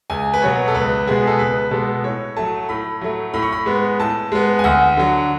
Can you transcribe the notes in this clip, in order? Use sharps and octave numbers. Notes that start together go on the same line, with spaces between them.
C#2 G#5
B4
B2 F#3 B3 C#5
A4
C#2 B4
B2 G#3 B3 G#4
A4
C#2 B4
B2 G#3 B3 A4
A2 C#5
F#3 A3 A5
A2 B5
F#3 A3
A2 B5
C#6
B5
G#3 B3
A2 A5
G#3 B3
G#5
D2 F#5
D3 F#3